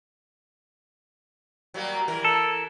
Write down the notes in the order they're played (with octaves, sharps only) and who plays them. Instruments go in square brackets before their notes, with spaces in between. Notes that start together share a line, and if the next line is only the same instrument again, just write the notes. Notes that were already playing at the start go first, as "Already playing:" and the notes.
[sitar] F#3 G3 A#3
E3 A#4
[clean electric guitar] A4